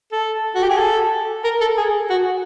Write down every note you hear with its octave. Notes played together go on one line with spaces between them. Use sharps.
A4
F#4
G4
G#4
A4
A#4
A4
G#4
F#4